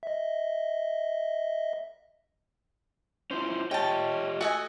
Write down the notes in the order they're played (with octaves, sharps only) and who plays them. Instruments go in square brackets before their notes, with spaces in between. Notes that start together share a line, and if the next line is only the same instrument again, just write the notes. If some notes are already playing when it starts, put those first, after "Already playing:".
[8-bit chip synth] D#5 E5
[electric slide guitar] C#4 E4 F4 [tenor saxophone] C5
[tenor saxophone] C#4 [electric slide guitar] F4 G4 D#5 [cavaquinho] G5 A5
[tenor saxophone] A3 [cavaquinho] F#4 D#5 G#5